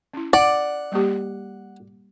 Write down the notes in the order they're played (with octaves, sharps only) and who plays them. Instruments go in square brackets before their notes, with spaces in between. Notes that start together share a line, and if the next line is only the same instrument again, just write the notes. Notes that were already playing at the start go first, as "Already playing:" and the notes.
[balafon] C#4 E4
[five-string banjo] D5 [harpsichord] F#5
[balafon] G3 A#3 G4